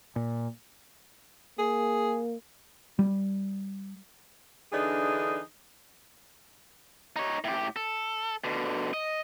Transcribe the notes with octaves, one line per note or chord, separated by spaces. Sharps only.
A#2
A#3 G#4
G3
D3 E3 D4 D#4 G#4
D#4 C#5
A2 G4
A4
B2 D3
D#5